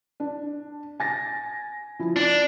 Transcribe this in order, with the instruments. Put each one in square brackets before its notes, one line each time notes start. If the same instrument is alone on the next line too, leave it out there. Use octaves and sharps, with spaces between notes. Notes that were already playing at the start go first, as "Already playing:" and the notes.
[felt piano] D4
G#5 A6 A#6
F3 E4
[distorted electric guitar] D4